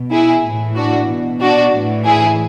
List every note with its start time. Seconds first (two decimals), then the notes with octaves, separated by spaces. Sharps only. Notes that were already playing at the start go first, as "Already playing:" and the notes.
Already playing: B2
0.11 E4 G#4
0.44 A2 E3
0.76 D4 F#4
1.08 B2
1.41 D4 F#4
1.73 A2 E3
2.05 E4 G#4